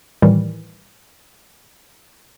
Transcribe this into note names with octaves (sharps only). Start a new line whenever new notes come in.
A2 D#3 E3 G3